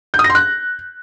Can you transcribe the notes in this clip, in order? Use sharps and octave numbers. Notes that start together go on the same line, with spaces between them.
G6
D#6
A#6
C6
F#6